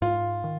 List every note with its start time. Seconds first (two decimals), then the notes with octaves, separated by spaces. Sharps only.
0.02 G#2 F4
0.44 D#3